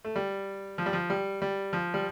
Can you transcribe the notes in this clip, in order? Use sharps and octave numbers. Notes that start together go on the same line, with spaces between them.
A3
G3
F3
G3
F3
G3
G3
F3
G3